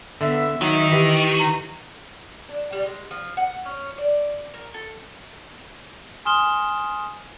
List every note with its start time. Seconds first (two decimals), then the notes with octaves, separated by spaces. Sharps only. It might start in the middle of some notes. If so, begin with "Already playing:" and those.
0.21 D3 B3 E5
0.61 D#3 F#3 D#4 F#4
0.91 E3 G4
1.39 A#5
2.49 D4
2.73 G3
2.86 G#3
3.11 F3
3.37 F#5
3.65 C#4
3.98 D5
4.54 A#4
4.74 A4
6.25 G#5 C6 D#6 F6 E7 G7